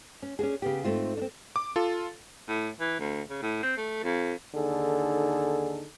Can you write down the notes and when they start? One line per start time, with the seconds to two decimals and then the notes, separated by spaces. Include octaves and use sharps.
0.22 C#4
0.39 C#4 D4 F#4 G#4
0.62 C#3 B3 G4
0.84 G#2 A3 C4 F4
1.17 C4 D4
1.56 D6
1.76 F4 A4
2.48 A2
2.80 E3
2.99 D2
3.30 C#3
3.42 A2
3.63 C4
3.77 A3
4.03 F2
4.54 D#2 D3 D#4 G#4 A4